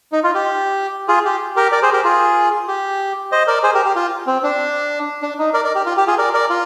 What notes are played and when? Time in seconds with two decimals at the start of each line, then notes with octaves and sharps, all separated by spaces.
0.12 D#4
0.24 F4
0.35 G4
1.08 F4 G#4
1.25 G4
1.56 G4 A#4
1.72 A#4 D5
1.82 G#4 C5
1.93 G4 A#4
2.04 F4 G#4
2.68 G4
3.32 C5 D#5
3.47 A#4 D5
3.63 G#4 C5
3.74 G4 A#4
3.85 G4
3.95 F4
4.27 C4
4.43 D4
5.22 D4
5.39 D#4
5.54 A#4 D5
5.64 A#4 D5
5.75 G4
5.86 F4
5.97 G4
6.07 F4 G#4
6.18 A#4 D5
6.33 A#4 D5
6.50 F4